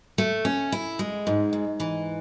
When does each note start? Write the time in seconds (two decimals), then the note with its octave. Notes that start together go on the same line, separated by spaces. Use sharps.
0.18 A3
0.45 C#4
0.72 E4
0.99 G#3
1.27 G#2
1.53 G#2
1.80 E3